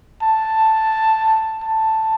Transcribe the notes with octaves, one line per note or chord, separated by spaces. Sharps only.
A5
A5